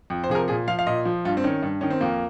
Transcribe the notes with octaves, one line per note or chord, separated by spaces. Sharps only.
F2
C5
C3 F3 G#4
A#4
A#2 G#4
F3 F5
F5
A#2 D#5
F3
G2 F4
C4
D#3 C#4
G2
D#3 C#4
C4
F2 A#3